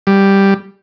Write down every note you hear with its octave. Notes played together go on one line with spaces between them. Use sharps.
G3